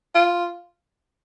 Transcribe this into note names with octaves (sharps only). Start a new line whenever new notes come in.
F4